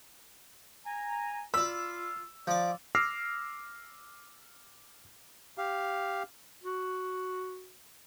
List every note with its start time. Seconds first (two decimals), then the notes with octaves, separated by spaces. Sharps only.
0.86 G#5 A#5
1.54 F4 D5 B5 E6
2.47 F3 D5 D6
2.95 D6 E6 F6 A#6 C7
5.58 G4 F5
6.64 F#4